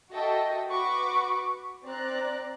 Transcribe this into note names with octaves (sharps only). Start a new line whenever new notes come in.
F#4 A4 D#5 E5 G5
F#4 B4 B5 C#6 D6
C4 D5 A#5 F#6